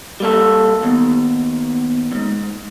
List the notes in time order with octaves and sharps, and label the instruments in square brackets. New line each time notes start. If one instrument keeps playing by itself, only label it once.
[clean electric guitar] G3 A#3 A4
[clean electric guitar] D#2 [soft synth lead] B3
[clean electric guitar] E2 G#2